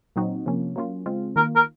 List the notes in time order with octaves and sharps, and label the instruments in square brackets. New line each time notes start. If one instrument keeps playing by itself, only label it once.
[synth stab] A#2 F#3 C4 D#4 F#4
C3 F3 A#3 C#4
F#3 A#3 C#4 F4
C#3 G#3 C4 F4
[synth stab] D#3 A#3 F4 [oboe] A#4
[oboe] A#4